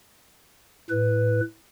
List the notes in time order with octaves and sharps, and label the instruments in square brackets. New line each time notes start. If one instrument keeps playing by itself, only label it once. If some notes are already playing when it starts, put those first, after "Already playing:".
[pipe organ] A2 B4